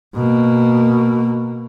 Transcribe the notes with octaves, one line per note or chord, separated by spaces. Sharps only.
B2 A#3